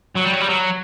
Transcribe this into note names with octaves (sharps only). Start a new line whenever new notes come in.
F#3
G3
F#3
G3
F#3